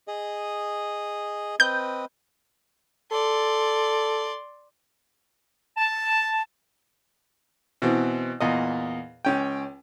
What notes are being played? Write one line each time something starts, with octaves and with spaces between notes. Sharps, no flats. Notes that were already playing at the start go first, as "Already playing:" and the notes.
G#4 D#5
C4 B4 D#5 G6
A4 D5 C6
A5
B2 E3 C4
E2 A#2 D#5
C#2 C#4 G5